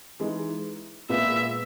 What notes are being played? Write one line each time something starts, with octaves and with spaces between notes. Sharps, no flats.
E3 G#3 D#4
A#2 G#3 B3 E5